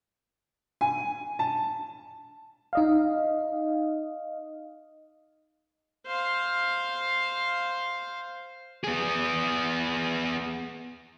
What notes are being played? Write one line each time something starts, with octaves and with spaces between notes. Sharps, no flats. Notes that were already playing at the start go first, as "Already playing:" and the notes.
G#5
A5
D#4 D#5 F5
C5 F5
B3 G#4